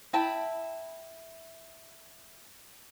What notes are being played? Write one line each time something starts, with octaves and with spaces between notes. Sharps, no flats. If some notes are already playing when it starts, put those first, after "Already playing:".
E4 G5 A5 B5